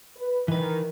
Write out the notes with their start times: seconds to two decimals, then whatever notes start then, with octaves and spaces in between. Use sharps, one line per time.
0.15 B4
0.48 D#3 E3 B4